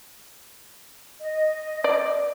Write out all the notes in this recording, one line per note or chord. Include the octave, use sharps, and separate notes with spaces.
D#5
D5